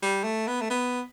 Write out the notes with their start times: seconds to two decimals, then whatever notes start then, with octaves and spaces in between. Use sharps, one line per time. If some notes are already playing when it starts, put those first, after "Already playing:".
0.02 G3
0.24 A3
0.48 B3
0.61 A3
0.70 B3